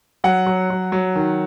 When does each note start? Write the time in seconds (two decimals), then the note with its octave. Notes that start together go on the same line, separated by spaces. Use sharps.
0.24 F#3 F#5
0.46 F#3
0.70 F#3
0.92 F#3
1.16 D#3